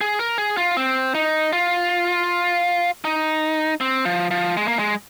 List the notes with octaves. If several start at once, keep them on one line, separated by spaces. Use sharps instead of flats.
G#4
A#4
G#4
F4
C4
D#4
F4
D#4
C4
F3
F3
G#3
A#3
G#3